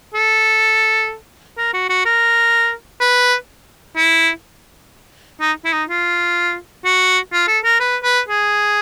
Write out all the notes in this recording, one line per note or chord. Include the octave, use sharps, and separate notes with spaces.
A4
A#4
F#4
F#4
A#4
B4
E4
D#4
E4
D#4
F4
F#4
F4
A4
A#4
B4
B4
G#4